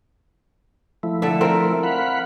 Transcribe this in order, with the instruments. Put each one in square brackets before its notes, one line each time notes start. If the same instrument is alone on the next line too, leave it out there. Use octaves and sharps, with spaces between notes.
[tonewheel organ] F3 A3 E4
[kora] D3 A4 E5
C4 A#4
[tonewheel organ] F5 F#5 B5